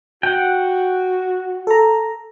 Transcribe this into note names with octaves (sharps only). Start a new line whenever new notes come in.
F#4 F#5 G5
A4 A#5